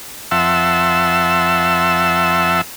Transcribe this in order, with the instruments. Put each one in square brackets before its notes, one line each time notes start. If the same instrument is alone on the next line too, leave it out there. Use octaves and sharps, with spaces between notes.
[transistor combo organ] F2 E5 F#5 A5 C6 E6